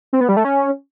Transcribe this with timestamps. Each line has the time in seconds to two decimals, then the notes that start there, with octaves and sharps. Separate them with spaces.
0.13 C4
0.21 B3
0.29 G3
0.37 A3
0.45 C#4